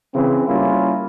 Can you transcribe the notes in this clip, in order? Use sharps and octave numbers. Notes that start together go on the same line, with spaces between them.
C#3 E3 C4
G3 A#3 C#4 E4 F4